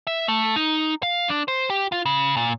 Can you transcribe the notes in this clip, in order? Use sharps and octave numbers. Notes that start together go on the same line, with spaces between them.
E5
A3
D#4
F5
D4
C5
G4
F4
C#3
A#2